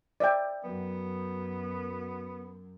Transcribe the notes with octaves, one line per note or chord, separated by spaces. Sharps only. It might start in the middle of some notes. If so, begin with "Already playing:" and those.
D5 E5 G5
F#2 B3